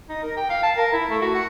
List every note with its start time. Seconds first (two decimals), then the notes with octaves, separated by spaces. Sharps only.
0.09 D#4
0.23 A#4
0.37 G5
0.50 F5
0.63 A5
0.77 A#4
0.93 E4
1.10 A3
1.21 F#4
1.35 F#5